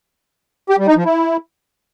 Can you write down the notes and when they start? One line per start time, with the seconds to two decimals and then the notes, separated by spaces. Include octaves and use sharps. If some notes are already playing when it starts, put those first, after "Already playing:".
0.70 G4
0.79 G3
0.87 D#4
0.96 F3
1.05 E4